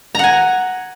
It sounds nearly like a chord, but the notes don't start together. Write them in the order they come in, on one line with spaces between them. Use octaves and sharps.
A#5 F#5 G#5